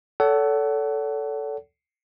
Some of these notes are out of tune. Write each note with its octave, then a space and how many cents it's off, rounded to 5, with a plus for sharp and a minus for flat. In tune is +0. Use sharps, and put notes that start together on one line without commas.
A4 +0 C#5 +45 F#5 +25